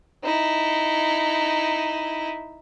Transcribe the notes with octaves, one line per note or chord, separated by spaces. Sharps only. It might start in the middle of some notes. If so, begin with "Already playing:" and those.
D#4 E4